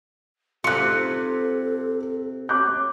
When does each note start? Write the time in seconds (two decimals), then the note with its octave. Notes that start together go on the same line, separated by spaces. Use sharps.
0.64 C3 F4 A4 F#6 C#7
0.88 D#4
1.07 A4
2.49 C#5 D6 F#6 G6